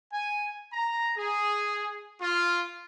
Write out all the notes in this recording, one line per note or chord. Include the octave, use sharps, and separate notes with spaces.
G#5
A#5
G#4
F4